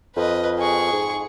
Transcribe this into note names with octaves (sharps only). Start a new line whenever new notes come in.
F2 B4 D#5
G#4 C#6
G#2